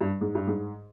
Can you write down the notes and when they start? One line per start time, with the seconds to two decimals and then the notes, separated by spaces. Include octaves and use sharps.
0.01 G2
0.21 G#2
0.35 G2
0.47 G#2